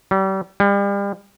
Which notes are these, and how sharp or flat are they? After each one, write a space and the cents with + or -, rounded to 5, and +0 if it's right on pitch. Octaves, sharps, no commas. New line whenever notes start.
G3 -35
G3 +35